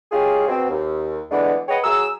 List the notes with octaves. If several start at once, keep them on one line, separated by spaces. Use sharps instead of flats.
G#3 C#4 F4 G4 G#4
B2 C4
D#2
D3 E3 G#3 A3 B3 D4
G#4 B4 C#5 D#5 F#5 G5
F#3 G#4 A#5 E6